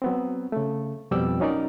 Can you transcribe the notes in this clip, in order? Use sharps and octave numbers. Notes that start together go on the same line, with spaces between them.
F#3 B3 C4
C#3 A3
F2 B2 G3 D5 G5 E6
F#3 C#4 D#4 A#4 D5